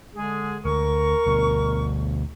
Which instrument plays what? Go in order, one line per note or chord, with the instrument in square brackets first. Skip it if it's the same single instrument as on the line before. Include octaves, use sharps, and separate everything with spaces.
[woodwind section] D3 G#3 G#4
[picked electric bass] D2 [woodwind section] A#4 C#6
[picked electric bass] D2 B2